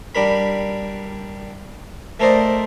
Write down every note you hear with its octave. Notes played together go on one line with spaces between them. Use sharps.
G3 D4 A#4 B5
A3 A4 A#4 C5 D5 D#5